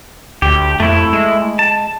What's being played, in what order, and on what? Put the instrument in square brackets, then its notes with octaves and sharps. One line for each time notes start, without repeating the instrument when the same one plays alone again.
[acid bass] D2 [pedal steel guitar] G4
[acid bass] F2 [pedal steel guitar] A3 E4
[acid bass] G#3
[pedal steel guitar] A5